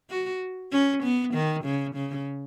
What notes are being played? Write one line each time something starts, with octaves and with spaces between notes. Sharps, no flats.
F#4
C#4
B3
D#3
C#3
C#3